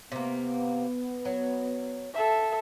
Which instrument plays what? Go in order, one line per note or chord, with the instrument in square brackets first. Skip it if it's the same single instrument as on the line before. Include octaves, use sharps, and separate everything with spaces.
[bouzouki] C3 A#3 [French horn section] B3
[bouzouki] F#3
[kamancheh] A4 E5